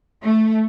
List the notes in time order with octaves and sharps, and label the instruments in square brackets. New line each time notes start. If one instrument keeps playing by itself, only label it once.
[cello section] A3